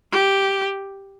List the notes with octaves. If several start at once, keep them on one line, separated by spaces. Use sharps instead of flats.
G4